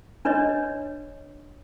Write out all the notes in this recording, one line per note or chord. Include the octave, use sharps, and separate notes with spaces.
D4 B4 C#5 D#5